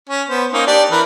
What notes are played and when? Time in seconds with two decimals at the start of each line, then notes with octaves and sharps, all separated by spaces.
0.09 C#4
0.29 B3 C5
0.53 A#3 C#4 D#4
0.67 D4 G4 D5
0.91 E3 A#4 B4